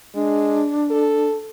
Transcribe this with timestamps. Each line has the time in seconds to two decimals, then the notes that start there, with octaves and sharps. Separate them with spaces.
0.15 G#3 D4
0.91 A4